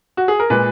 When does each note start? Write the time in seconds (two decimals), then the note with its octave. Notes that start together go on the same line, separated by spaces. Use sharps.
0.17 F#4
0.28 G#4
0.40 A#4
0.50 A#2 G#3 B4